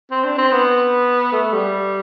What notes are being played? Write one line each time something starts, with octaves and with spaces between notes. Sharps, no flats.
C4
D4
C4
B3
A3
G3